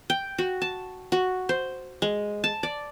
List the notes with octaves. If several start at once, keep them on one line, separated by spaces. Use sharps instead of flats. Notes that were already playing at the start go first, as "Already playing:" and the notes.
G5
F#4
A5
F#4
C5
G#3
A5
D5